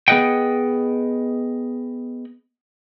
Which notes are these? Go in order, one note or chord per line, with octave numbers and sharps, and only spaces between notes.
B3 G#4 B4 D#5 F#5 G5